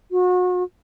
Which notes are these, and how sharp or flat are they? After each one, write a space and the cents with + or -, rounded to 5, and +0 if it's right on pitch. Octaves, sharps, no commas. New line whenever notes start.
F#4 -35